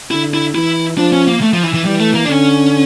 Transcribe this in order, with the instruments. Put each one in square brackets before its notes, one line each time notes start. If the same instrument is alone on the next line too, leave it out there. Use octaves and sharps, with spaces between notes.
[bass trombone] D3 [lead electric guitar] E4
[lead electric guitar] E4
[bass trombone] E3 [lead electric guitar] E4
[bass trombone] F3 [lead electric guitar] D4
[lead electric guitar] C#4
A#3
A3
F3
E3
E3
[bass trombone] E3 [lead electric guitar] G3
[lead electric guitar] A3
A#3
D4
[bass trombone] D3 [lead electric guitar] C#4